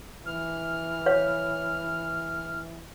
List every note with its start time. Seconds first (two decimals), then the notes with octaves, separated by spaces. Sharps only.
0.25 E3 F6
1.06 C#5 F5